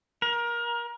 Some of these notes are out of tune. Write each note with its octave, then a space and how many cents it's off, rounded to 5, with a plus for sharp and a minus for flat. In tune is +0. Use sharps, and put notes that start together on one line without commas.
A#4 +25